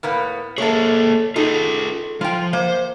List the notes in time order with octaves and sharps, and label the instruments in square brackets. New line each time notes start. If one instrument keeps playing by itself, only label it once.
[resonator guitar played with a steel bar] A2 A#3 B3
[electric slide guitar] A#3 G#4 [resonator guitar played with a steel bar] A4 C#5
[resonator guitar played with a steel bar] D#4 A4 [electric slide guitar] F4 G#4
[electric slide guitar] F3 [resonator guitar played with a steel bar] F4 G5
[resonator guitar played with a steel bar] A#3 [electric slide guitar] C5